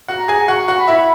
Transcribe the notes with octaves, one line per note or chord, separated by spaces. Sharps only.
F#4 F#5
A#5
G#4 G#5
F#4 F#5 C#6
F#4 F#5
B5
E4 E5